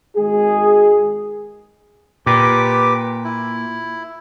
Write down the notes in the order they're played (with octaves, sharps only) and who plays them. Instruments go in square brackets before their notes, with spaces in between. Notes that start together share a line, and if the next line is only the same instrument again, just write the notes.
[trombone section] G#1 G#3 G#4
[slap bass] A#2 [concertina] G4 B4 D6
[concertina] E4